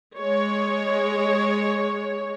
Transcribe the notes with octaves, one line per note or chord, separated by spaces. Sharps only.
G#3 C#5